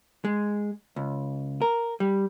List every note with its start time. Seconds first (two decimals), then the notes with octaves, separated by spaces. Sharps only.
0.25 G#3
0.96 C#2
1.61 A#4
2.00 G3